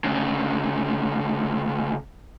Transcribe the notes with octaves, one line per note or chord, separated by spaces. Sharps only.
D2 C#3